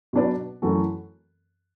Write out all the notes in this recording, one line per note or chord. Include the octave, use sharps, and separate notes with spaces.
B2 F#3 D4 B4 D5
F#2 E3 A3 F#4 A4